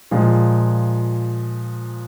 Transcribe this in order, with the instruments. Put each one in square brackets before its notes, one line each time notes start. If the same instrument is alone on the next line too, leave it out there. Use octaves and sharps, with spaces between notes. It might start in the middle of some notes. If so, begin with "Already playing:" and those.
[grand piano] A#2 F3 G#3